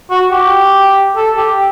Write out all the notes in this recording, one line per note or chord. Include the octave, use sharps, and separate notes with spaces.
F#4
G4
A4
G4